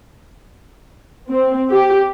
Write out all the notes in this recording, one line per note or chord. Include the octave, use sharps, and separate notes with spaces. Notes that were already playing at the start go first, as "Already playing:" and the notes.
C4
G4